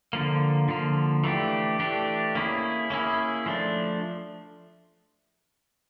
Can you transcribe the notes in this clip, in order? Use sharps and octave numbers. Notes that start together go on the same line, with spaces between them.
D3 F3 A#3
D3 F3 A#3
E3 A3 D4 G4
E3 A3 D4 G4
A#3 C#4 E4 G#4
A#3 C#4 E4 G#4
F3 A3 D4